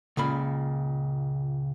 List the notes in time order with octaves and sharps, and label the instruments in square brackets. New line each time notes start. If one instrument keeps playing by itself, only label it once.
[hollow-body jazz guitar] C#2 A#2 C#3 B5